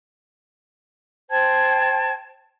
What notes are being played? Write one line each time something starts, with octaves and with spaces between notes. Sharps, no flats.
C5 G5 A5 G#6